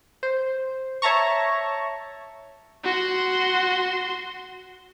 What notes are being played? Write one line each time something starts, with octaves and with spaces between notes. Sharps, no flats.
C5
C#5 E5 A5 A#5 C#6
F#4 C6